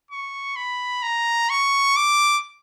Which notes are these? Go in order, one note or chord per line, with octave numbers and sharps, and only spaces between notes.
C#6
B5
A#5
C#6
D6